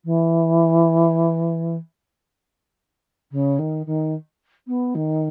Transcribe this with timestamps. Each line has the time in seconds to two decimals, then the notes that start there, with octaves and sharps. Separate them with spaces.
0.04 E3
3.31 C#3
3.59 D#3
3.86 D#3
4.67 B3
4.95 D#3